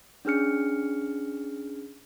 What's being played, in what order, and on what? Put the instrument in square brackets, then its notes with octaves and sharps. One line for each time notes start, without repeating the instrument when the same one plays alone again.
[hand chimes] C#4 D4 G#4 F6 C#7